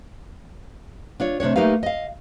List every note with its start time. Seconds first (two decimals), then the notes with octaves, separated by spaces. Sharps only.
1.20 D4 F4 C#5
1.40 C3 A3 D4 C#5
1.56 A3 A#3 D#4 G4 B4 F5
1.83 D#5 F5